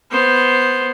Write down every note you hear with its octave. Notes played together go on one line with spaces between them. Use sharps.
B3 C5